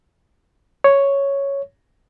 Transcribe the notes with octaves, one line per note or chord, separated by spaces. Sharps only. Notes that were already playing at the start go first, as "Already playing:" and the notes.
C#5